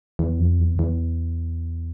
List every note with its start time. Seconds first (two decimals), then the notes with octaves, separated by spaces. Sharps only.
0.19 E2
0.39 F2
0.60 E2
0.79 E2